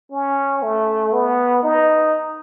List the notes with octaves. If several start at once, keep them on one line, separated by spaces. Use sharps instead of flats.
C#4
A3
B3
D#4